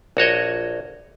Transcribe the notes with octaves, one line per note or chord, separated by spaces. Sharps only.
A#1 F#4 C#5 D#5